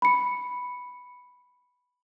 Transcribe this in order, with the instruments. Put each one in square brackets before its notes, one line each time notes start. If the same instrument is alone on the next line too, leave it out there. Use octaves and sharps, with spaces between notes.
[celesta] B5 C#7